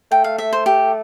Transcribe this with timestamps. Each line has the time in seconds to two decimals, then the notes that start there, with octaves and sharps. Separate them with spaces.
0.11 A3 G5
0.24 F5
0.38 E5
0.53 C5
0.66 G4